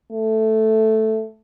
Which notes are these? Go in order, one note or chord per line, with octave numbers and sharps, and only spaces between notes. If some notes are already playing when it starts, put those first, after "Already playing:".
A3